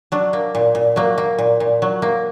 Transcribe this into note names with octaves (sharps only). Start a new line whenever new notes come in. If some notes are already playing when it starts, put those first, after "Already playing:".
F#3 D4
A#3
A#2
A#2
F#3 A#3
A#3
A#2
A#2
F#3
A#3